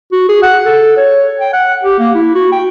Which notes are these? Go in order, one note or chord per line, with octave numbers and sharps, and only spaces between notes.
F#4
G#4
F#5
A4
C#5
G5
F#5
G4
A#3
E4
F#4
G5